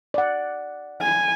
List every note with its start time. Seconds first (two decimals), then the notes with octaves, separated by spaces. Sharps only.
0.14 D5 F#5
1.02 G#5